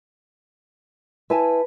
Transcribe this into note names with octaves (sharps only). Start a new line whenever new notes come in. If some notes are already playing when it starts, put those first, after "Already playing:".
E4 B4 G#5 A5